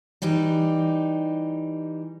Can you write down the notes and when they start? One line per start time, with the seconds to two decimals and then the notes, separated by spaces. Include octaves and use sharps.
0.22 E3 G3 D#4 G4